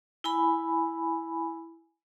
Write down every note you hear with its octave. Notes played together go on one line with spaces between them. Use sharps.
E4 G#5 B5